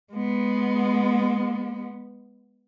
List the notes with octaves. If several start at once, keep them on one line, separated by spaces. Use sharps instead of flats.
G#3 B3